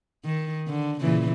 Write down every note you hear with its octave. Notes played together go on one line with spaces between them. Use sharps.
D#3
D3
A#2 C#3 E3